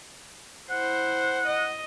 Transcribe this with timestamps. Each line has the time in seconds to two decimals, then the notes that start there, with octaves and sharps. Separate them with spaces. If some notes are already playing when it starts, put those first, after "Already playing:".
0.70 E4 C5 F#5
1.46 D#5